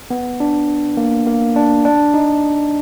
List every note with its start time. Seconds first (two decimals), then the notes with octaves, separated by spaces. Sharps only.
0.11 B3
0.40 D4
0.97 A#3
1.27 A#3
1.56 D4
1.85 D4
2.14 D#4